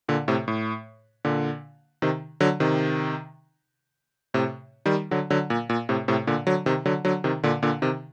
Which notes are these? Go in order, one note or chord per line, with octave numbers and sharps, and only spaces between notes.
A#2 D3
A2 C3
A2
A#2 D3
C3 D#3
D3 F#3
C3 D#3
A2 C3
D#3 G3
D3 F#3
D3 F#3
A#2
A#2
A2 C3
A2 C3
A#2 D3
D3 F#3
C3 D#3
D3 F#3
D3 F#3
C3 D#3
A#2 D3
A#2 D3
C3 D#3